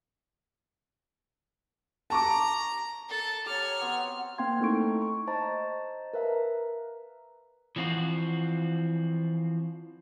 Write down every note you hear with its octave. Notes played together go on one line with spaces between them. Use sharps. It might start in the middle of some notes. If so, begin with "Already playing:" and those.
A5 A#5 C#6 D6
A4 A5
G4 C#5 A#5 F6
B3 C4 F#4
A#3 C4 F5 G5 C6 G#6
A3 D#4 E4 A4 C#6 D7
C#6
C5 D#5 A5 A#5 A6
A#4 B4 E5 F5 A#5
E3 F3 C4 F4 F#4